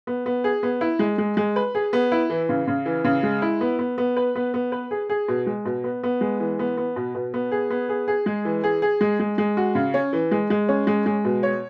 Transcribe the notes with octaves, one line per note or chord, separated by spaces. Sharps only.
B3
B3
G#4
B3
E4
G#3
G#3
G#3
B4
G#4
B3
E4
E3
C#3
C#3
E3
C#3
G#3
E4
B3
B3
B3
B4
B3
B3
B4
G#4
G#4
B2
G#3
B2
B3
B3
G#3
E3
B3
B3
B2
B2
B3
G#4
B3
G#4
G#4
G#3
E3
G#4
G#4
G#3
G#3
G#3
F#4
C#3
C#4
E3
G#3
G#3
C#4
G#3
G#3
B2
C#5